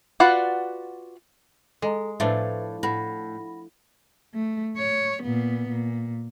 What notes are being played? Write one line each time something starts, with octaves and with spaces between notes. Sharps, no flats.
F4 F#4 B4 D5 F#5
G#3 A4 D#5 A#5
A2 F3 A3 D4 B4 E5
A2 F#5 B5 A#6
A3
C#5
A#2 B3
A#2